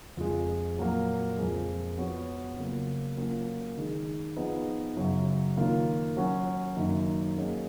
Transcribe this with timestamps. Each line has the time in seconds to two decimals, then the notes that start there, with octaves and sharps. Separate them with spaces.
0.17 F2 F3 G#3
0.77 A#2 F#3 A#3
1.38 F2 F3 G#3
1.97 F3 B3 F#4 C#5
2.57 C#3 F#3 A#3 F4
3.17 F#3 A#3 C#4 F4
3.77 D#3 G#3 D#4 G#4
4.36 F3 B3 D#4 G#4 B4
4.97 F#2 C#3 F#3
5.57 D#3 A#3 F4
6.17 F#3 C#4 F#4
6.76 F#2 D#3 A#3 D#4
7.37 F#3 A#3 C#4 G#4 D#5